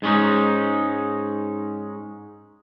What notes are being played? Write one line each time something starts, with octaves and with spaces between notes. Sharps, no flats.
G#2 G#3 C#4 D#4